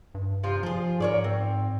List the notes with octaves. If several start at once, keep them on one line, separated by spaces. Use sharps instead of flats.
G2
C3 F3 F4
F3 F4 G#4
G#2 A#4 C#5 D5
C4